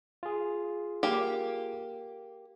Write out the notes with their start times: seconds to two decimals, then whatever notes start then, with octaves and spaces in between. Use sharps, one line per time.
0.23 F4 G#4
1.03 A#3 G4